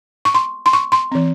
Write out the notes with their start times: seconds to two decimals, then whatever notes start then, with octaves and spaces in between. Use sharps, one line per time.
0.25 C#6
0.34 C6
0.66 C6
0.73 C#6
0.92 C6
1.12 E3 C4